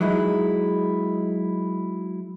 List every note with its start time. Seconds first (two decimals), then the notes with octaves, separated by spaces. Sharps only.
0.01 F#3 G#3 D#4 E4